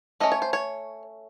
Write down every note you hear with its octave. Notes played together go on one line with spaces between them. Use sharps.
A3 C#4 D#5
C#5
C5
C#5